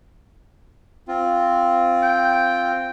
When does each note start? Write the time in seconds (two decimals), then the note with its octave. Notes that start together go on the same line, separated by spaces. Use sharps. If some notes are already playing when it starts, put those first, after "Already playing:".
1.08 C4 F4
2.03 G5